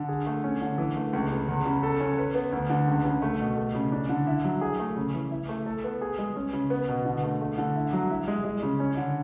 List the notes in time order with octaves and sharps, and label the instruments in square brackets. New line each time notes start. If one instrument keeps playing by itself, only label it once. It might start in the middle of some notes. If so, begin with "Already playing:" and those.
Already playing: [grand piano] D3
G#4
A3
C#4
D3
E3
A3
C#2
C#3
E2
C#3
A4
C#4
B4
B3
D2
D3
C#2
C#3
A3
B2
A3
C#3
D4
D3
E4
F#3
G#4
A3
C#3
E3
E4
A3
A4
B3
G#4
G#3
C#4
C#3
B3
B2
D3
A3
A3
D3
E4
F#3
E4
G#3
G#3
C#3
C#4
D3